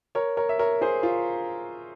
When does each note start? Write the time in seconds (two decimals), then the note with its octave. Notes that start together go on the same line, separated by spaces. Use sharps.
0.15 A#4 C#5
0.37 A#4 C#5
0.49 E5
0.59 A#4 C#5
0.81 G#4 C5
1.03 F4